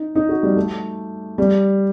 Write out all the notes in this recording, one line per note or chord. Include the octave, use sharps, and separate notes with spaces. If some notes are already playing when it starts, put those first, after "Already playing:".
Already playing: D#4
D#4
F#4
G3
A3
G3